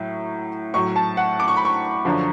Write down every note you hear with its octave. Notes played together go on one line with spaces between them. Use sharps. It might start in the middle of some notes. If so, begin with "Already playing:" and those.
Already playing: A2 F#3
A2 F#3 C#6
A5
F#5
D6
C#6
B5
C#6
F#2 D3 F3